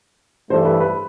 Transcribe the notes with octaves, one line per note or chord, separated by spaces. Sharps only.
G2 E3 A3 D4 A4 C5
B4
B4